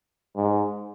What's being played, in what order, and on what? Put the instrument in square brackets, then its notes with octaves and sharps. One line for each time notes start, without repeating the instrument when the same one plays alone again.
[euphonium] G#2